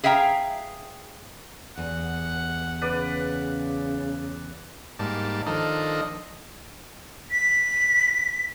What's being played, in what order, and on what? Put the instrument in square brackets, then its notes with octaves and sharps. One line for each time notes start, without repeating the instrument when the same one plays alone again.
[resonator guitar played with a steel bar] G#4 E5 F5 G5 A#5
[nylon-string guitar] E2 [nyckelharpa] F#5
[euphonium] C#3 [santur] B4 D5
[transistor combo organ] G#2 G3 A#3 A5
D#3 F3 D4 A4 A#4 D#5
[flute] B6